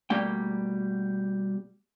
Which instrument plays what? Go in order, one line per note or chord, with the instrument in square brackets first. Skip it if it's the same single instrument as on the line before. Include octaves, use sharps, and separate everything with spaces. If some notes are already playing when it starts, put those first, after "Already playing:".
[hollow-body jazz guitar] B2 G3 A3 A#3 G5